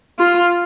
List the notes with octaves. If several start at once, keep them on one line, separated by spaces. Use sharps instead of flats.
F4